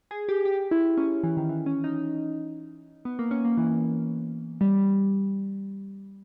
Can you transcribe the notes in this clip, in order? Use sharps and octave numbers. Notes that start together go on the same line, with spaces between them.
G#4
G4
G4
E4
C#4
E3
D#3
E3
C#4
D#4
B3
A#3
C#4
A#3
E3
G3